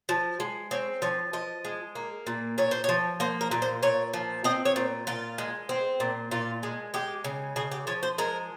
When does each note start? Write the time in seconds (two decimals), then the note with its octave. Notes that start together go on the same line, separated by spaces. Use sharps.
0.09 F3
0.40 G#3
0.71 C4 C#5
1.02 F3 C#5
1.33 F3 D#5
1.65 G#3
1.95 A#3
2.27 A#2
2.58 A#2 C#5
2.71 C5
2.84 F3 C#5
3.20 A#3 C5
3.41 A#4
3.51 A#2
3.62 C5
3.83 A#2 C#5
4.14 F3
4.44 C4 D#5
4.65 C#5
4.76 A#2
5.07 A#2 F4
5.38 G#3
5.69 C4
6.00 A#2
6.31 A#2 F4
6.63 G#3
6.94 G#3 G4
7.24 C#3
7.56 C#3 G#4
7.71 G4
7.87 F3 C#5
8.03 C5
8.18 G#3 A#4